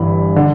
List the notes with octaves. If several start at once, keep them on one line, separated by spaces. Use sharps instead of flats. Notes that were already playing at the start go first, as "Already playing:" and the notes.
Already playing: G1 G2 E3 B5
D3